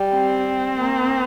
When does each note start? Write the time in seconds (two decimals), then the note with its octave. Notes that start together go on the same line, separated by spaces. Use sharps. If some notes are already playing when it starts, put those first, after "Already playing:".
Already playing: G3
0.14 C4
0.77 A#3